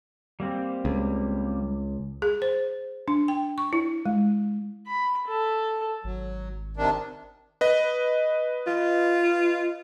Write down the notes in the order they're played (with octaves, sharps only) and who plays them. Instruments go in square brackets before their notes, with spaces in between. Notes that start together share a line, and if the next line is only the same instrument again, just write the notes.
[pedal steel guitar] G3 A#3 C4
[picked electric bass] C#2
[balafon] G#4
C5
D4
G5
C#6
E4
G#3
[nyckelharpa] B5
A4
[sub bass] G#1 [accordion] F#3
[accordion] C3 D#3 D4
[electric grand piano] B4 D#5
[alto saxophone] F4